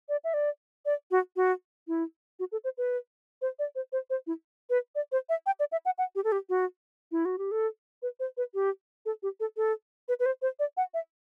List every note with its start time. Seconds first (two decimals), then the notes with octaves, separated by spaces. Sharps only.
0.09 D5
0.24 E5
0.34 D5
0.86 D5
1.11 F#4
1.36 F#4
1.88 E4
2.40 F#4
2.52 A4
2.64 C5
2.78 B4
3.42 C5
3.59 D5
3.75 C5
3.92 C5
4.10 C5
4.27 E4
4.70 B4
4.95 D5
5.12 C5
5.29 E5
5.46 G5
5.60 D5
5.72 E5
5.85 F#5
5.98 F#5
6.15 G4
6.24 A4
6.32 G4
6.49 F#4
7.12 E4
7.25 F#4
7.38 G4
7.51 A4
8.02 B4
8.20 C5
8.37 B4
8.54 G4
9.06 A4
9.23 G4
9.40 A4
9.57 A4
10.08 B4
10.20 B4
10.26 C5
10.42 C5
10.59 D5
10.77 F#5
10.94 E5